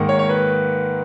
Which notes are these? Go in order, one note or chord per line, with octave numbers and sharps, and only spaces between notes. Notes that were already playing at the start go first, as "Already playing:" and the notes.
Already playing: G#2 D#3 A#3
C#5
C#5
B4